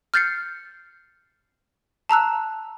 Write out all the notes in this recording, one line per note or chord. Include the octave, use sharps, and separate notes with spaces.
F6 G6 A6 C7 C#7
A5 A#5 E6 F#6